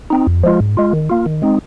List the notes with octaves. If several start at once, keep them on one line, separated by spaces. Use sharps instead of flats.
C4 D#4
F2
F3 G#3 F4
G#2
G#3 F4
D#3
A#3 F4
D#3
G#3 C4 D#4